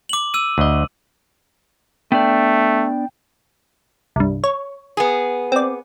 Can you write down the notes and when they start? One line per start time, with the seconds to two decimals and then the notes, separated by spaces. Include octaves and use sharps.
0.09 D6 F#7
0.34 E6 D#7
0.58 D2 D#5
2.12 A3 B3 D4 D5 G5
4.16 C2 G2
4.44 C#5
4.97 B3 G#4
5.52 C4 D5